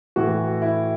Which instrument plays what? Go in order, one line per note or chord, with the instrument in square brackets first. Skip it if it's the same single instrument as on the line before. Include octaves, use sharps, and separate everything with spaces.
[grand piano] A2 E3 F#4
E4